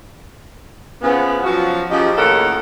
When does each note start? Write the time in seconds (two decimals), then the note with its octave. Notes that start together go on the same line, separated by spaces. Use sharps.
1.02 C#3 E3 F3 B3
1.43 F3 F#3 F#4
1.90 C#3 F3 D#4 G4
2.17 D#2 A2 C#3 A4 A#4 F#5